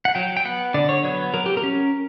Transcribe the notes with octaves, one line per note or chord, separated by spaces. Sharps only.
F#5
F#3 G5
G5
B3 F#5
D3 D5
C#5
F#3 B3 C#5
F#3 A#4
G4
A#4
C#4